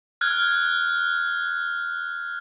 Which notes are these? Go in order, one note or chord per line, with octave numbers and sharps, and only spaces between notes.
F6 F#6 G#6